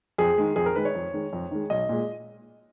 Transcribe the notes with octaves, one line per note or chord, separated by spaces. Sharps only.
F2 G#4
D#3 G#3
F2 G#4
A#4
D#3 G#3 B4
C#5
F2
D#3 G#3
F2
D#3 G#3
B1 D#5
A#2 G#3